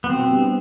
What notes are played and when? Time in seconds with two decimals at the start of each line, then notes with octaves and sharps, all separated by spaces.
0.04 B3
0.10 B2 C4
0.30 G3 B3 D4